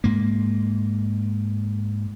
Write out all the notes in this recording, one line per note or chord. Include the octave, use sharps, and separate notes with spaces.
G#2 A#3